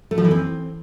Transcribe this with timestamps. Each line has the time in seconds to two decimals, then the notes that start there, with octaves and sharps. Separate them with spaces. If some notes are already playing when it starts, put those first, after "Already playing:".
0.11 A3
0.18 F3
0.24 E3
0.31 C4